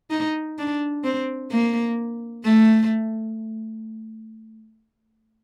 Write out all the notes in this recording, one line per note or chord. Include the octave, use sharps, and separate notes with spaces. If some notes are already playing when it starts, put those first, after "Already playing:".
D#4
D4
C4
A#3
A3